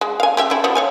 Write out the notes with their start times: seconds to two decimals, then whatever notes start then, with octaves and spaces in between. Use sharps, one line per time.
0.01 G#3
0.20 F5 G#5
0.37 C#4 G4 E5
0.50 A3 E4
0.64 F3 B3 D4
0.75 C#5 F5 G#5